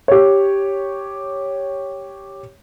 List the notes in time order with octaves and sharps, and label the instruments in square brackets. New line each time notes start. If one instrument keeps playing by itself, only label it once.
[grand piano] G4 C#5